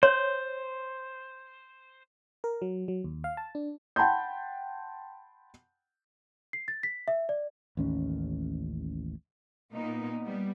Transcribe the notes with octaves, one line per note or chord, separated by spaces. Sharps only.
C5 C#5
A#4
F#3
F#3
D#2
F5
A5
D4
F#5 G5 A5 B5 C6 G6
C7
A6
B6
E5
D5
A1 D#2 C#4
A#2 A#3 B3 D#4
G3 B3